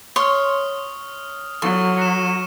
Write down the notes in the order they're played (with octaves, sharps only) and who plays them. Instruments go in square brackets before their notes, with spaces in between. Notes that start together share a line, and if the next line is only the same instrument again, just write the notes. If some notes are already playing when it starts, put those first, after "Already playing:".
[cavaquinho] C#5 C6 [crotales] D#6 F6
[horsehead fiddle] F#3 [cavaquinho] A4 [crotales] C#6 F6
[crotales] C#7 E7